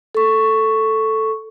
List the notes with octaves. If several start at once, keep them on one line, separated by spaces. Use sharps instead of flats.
A4 C#6